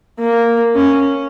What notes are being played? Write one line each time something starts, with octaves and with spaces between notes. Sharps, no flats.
A#3
C#4